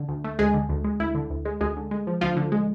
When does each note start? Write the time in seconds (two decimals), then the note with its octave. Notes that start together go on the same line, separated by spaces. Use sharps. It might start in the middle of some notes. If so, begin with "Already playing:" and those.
Already playing: D3
0.08 D2
0.24 A3
0.39 D2 G#3 G#4
0.54 D3
0.69 D2
0.84 G#3
1.00 D2 E4
1.15 D3
1.30 D2
1.45 G#3
1.61 D2 G#3 G#4
1.77 D3
1.91 G#3
2.07 F3
2.21 D2 F3 F4
2.36 D3
2.52 G#3